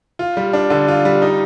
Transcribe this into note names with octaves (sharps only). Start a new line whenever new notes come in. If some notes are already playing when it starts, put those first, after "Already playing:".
F4
G3
D4
D3
F4
G3
D#4